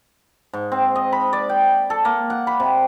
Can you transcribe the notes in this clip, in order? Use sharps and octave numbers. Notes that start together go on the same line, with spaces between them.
G#2
C4
D#5
B5
D5
G5
A4
A#3
F#5
B5
C3